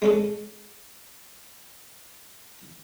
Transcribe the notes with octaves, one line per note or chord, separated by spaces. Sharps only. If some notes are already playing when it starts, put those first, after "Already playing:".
G#3 C#4 A4